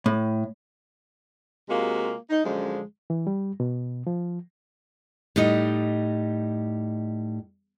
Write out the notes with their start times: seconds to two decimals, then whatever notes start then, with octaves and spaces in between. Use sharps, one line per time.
0.06 A2
1.69 C3 G#3 A#3 F4 F#4
2.30 D#4
2.45 F#2 D3 F3 G#3
3.10 E3
3.27 G3
3.60 B2
4.07 F3
5.36 A2 G3 D#4 D#5